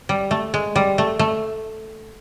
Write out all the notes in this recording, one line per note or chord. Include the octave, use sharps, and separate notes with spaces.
G3
A3
G#3
G3
A3
A3